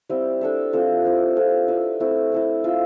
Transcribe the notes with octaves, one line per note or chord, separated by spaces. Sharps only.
G3 C4 E4 G4
D4 A4 E5
F3 C4 E4 A4
C4 E4 G4
C4 F4 A4
E4 B4 E5
A3 C4 E4
E4 A4 C5
C4 F4 A4 E5